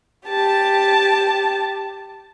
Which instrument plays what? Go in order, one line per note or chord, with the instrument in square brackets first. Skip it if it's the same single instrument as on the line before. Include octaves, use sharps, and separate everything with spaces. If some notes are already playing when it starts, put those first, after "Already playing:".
[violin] G4 A5